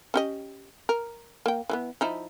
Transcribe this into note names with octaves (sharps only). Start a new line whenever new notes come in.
C#4 G4 D#5
A#4
A#3 G5
E3 G#3 B3
F3 D#4 E4